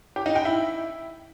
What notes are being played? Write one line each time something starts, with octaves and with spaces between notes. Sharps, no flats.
G4
D#4
G5
E4